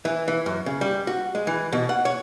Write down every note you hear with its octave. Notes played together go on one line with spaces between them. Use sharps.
E3
E3
F#2
C#3
G3
F#4
G#3
E3
B2
F#5
C#5